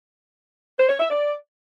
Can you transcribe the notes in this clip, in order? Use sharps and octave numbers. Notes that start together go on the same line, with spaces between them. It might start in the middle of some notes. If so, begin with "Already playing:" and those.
C5
C#5
E5
D5